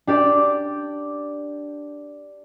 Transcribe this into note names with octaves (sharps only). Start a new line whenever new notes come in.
D4 G4 D5